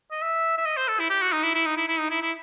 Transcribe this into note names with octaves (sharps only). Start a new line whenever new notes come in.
D#5
E5
E5
D#5
C5
A4
E4
G4
F#4
D#4
E4
E4
D#4
E4
E4
D#4
E4
E4